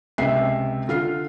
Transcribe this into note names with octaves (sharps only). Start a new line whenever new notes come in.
C#2 C3 E5 C7
D3 F4 F6 C7